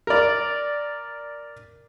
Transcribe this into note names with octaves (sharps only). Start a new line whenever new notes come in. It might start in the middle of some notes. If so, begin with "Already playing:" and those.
A#4 D5